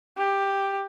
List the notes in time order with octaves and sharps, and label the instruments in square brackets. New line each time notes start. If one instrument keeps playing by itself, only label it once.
[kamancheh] G4